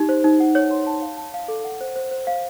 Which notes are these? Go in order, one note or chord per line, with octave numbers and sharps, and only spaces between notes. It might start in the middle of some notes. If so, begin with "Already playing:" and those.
Already playing: D#4 G4
C5
D#4
F#5
C#5
C6
A5
F5
A5
F5
A4
F#5
C5
C5
C5
F5